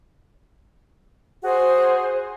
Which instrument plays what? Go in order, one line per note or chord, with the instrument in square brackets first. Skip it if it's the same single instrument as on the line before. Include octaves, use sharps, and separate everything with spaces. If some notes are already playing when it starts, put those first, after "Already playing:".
[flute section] F#4 G#4 C5